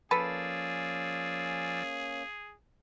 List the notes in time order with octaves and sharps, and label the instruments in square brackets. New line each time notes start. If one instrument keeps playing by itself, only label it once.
[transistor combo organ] F3 D5 E6 [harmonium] A#3 C#4 [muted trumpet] G#4 [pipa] A4 B4